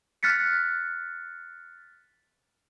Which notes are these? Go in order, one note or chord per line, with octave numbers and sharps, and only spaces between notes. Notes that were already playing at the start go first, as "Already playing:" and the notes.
F6 F#6 A6 B6 C#7